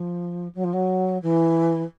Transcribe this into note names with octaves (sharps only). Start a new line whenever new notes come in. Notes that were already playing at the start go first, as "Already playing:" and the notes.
Already playing: F3
F#3
F3
F#3
E3